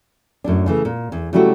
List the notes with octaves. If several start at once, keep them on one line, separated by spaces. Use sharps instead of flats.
F#2 A2 D4
C#3 E3 A3
A#2
E2
C#3 F#3 G3 A3 E4 F#4